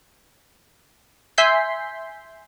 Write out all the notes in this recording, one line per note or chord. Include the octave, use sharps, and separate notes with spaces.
E5 G#5 C6 G6 B6 C7